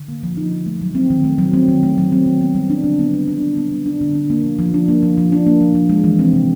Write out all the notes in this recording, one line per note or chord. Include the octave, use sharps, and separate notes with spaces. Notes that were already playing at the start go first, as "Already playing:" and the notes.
Already playing: D3
A#3
F3
D#4
D3
A3
F#3
C4
D#3
A3
F#3
C4
D#3
A3
F#3
C4
D#3
B3
G3
D4
D3
B3
G3
D4
D3
B3
G3
D4
D3
D4
A#3
F3
F3
D4
A#3
F3
F3
D4
A#3
F3
F3
G#3
E3
C4
C3